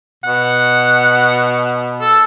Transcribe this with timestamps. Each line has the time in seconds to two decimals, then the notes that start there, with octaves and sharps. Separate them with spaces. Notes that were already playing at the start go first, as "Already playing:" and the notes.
0.24 B2 F#5
2.01 A4